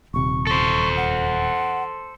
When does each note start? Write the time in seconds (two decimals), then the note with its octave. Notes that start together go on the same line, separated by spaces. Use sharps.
0.14 D#1 C3 C#6
0.47 A4 C5 C#6
0.97 F#5